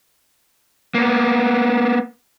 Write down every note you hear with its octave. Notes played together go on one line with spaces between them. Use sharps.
A#3 B3